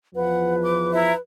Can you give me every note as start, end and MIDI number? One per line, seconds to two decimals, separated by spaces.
0.15 1.11 40
0.15 1.11 53
0.15 1.21 71
0.15 0.52 78
0.60 0.92 86
0.93 1.12 64
0.93 1.12 76
0.93 1.12 82